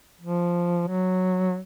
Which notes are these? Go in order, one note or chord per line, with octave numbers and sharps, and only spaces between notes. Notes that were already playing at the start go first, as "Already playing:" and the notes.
F3
F#3